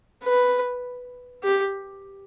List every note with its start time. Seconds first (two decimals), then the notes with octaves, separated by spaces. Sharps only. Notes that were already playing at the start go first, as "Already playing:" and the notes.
0.24 B4
1.43 G4